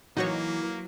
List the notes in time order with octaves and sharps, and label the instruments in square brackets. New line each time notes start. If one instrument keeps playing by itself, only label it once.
[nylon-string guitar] E3 [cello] F#3 [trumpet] A#3 [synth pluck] D#4 F#4 C#5